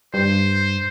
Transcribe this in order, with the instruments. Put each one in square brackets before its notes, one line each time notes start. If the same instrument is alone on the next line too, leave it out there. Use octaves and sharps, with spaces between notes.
[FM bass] G2 [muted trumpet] C5